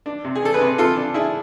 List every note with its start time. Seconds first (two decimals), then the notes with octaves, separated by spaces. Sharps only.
0.06 D4
0.24 C3
0.35 G#4
0.42 D4 A4
0.54 G#4 B4
0.61 C3
0.78 C3 F4 A4
0.97 D4
1.14 D4 E4 G#4